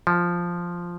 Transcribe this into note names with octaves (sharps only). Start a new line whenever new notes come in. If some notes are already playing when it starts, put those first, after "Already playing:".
F3